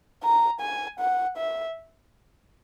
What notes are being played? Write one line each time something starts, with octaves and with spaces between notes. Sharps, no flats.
A#5
G#5
F#5
E5